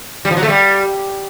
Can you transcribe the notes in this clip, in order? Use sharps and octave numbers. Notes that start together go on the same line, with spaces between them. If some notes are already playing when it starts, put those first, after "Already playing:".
G3
F3
F#3
A3
G3